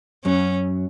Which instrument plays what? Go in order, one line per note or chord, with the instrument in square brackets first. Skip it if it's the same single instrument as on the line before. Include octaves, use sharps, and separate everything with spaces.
[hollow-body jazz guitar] F#2 F#3 [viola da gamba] C#4